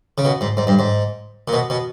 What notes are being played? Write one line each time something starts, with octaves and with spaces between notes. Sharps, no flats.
C#3
B2
G#2
G#2
G2
G#2
A#2
B2
B2